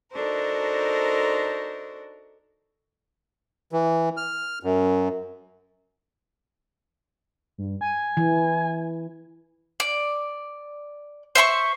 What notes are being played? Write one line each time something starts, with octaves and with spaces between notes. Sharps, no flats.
D4 D#4 F#4 A4 A#4 C5
E3
F6
F#2
G2
G#5
E3
D5
C5 E5 C6 C#6